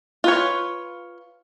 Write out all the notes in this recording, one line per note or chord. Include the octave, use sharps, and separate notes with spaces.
F4 B4 C#5